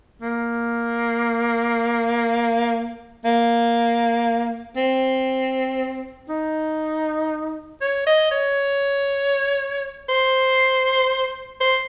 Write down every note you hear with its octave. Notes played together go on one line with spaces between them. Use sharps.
A#3
A#3
C4
D#4
C#5
D#5
C#5
C5
C5